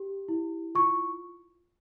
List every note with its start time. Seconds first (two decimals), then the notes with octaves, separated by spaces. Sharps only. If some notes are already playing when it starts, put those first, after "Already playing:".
Already playing: G4
0.29 E4
0.75 F4 C#6